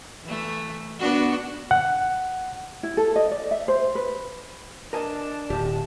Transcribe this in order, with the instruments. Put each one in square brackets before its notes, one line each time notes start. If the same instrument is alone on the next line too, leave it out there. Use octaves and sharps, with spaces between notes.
[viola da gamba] E3 A3
B3 D4 F#4
[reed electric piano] F#5
[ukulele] E4
A4
D#5
D5
E5
C5
B4
[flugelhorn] D4 [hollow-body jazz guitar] A#4 D#5 G#5 [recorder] A5
[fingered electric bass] D1 [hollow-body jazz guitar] G4